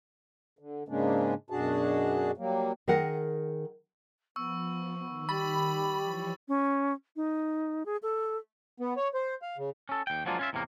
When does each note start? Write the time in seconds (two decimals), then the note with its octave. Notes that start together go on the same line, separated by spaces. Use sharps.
0.59 D3
0.89 G#2 C#3 G#3 A#3 C#4 D4
1.50 F#2 B2 D4 F#4 G#4 A5
2.37 F#3 G3 A#3
2.88 D#3 G#4 A#4 F#5
4.36 F3 B3 C#6 E6
4.99 D#3 B3
5.29 G3 B5 C#6 A6
5.99 E3 F3 C#5
6.48 C#4
7.16 D#4
7.86 G#4
8.02 A4
8.80 B3
8.97 C#5
9.14 C5
9.42 F5
9.58 C#3
9.89 C#4 A4
10.07 D#2 G5
10.26 F3 F#3 G#3 A#3 D4 F4
10.39 C#4 F4 E5
10.53 E2 A2 C3 A#3